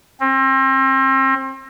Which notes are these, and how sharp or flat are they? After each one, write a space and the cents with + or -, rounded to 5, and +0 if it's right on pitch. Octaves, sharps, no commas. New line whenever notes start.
C4 +35